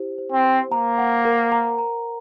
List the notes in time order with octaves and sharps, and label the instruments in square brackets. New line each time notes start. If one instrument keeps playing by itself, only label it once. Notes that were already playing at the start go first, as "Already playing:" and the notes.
Already playing: [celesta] E4 G4 C5
C5
[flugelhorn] C4
[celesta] C5
[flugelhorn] A#3 [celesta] A#5
[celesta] F#5
A#4
A#5
A#5